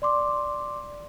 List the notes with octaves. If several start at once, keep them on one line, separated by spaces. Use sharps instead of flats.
D5 C6 D6